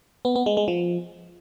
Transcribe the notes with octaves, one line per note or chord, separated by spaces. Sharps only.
B3
B3
G#3
G#3
F3